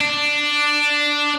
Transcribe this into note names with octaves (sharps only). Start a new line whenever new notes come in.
D4